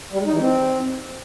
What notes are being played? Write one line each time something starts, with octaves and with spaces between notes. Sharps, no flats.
G3
G#3
D#4
E3
C4